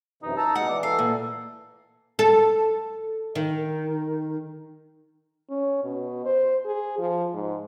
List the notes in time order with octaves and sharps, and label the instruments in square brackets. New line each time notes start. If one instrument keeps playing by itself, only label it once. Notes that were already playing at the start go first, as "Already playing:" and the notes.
[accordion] F#2 C3 E3 [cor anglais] D#4
[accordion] A5 A#5 E6
[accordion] B2 G#3 [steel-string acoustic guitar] F#5
[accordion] E3 [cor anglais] D5
[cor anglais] A4 [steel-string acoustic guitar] F5
[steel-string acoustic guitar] A#2
[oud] A4
D#3
[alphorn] C#4
B2
C5
G#4
F3
G#2